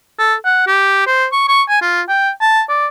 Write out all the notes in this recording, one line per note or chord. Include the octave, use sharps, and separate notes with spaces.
A4
F#5
G4
C5
C#6
C#6
G#5
F4
G5
A5
D5